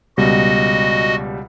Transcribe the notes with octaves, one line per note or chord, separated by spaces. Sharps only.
C#2 B2 G3 F#4 D#5